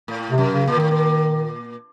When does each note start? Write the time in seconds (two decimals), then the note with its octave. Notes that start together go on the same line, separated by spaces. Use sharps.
0.08 A2
0.31 C3
0.38 F#2
0.53 C#3
0.67 A#2
0.75 A2 D#3
0.91 A#2